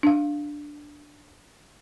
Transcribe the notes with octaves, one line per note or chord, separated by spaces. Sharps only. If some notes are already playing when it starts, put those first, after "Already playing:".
D4 F5